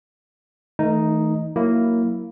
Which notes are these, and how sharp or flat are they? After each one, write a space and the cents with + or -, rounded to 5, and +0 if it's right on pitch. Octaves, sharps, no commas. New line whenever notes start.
E3 -45 A3 +0 D#4 +0
F#3 +0 A#3 -5 E4 +0